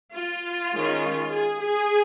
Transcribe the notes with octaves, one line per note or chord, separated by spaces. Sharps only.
F4
D#3 G#3 C#4
G#4
G#4